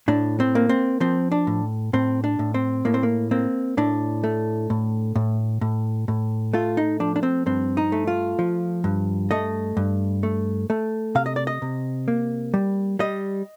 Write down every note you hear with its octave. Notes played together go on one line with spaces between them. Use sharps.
A2 D4
C4
A#3
C4
F3 C4
D4
A2
A2 C4
D4
A2
C4
A2 A#3
C4
A#3
A#3 C4
A2 D4
A3
A2
A2
A2
A2
A3 F4
D#4
F3 D4
D4
C4
G2 C4
D#4
A3
F4
F3
G2
A3 D#5
G2
A3
A3
C3 F5
D#5
D5
D#5
C3
A#3
G3
G3 D#5